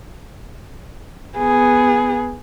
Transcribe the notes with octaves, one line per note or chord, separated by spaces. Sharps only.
B3 G#4